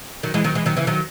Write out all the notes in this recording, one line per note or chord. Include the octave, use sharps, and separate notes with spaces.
D#3 F#3
E3 G#3
D#3 F#3
E3 G#3
D#3 F#3
C#3 E3
D#3 F#3